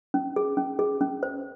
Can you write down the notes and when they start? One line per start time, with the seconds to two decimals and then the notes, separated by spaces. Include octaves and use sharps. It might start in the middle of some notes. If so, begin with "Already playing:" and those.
0.14 C#4
0.36 G#4
0.57 C#4
0.79 G#4
1.01 C#4
1.23 C5